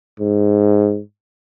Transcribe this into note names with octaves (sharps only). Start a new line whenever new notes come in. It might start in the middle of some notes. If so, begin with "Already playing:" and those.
G#2